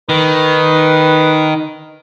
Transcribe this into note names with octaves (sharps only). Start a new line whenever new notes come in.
D#3 B4